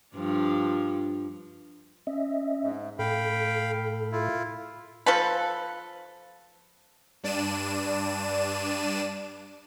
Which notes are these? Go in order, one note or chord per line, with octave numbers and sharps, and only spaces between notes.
G2 F3 D4
C#4 D#5 E5
G#2
A2 A4 F5 G5 B5
E4 F4
F3 A4 B4
G2 D4 D5 D#7 E7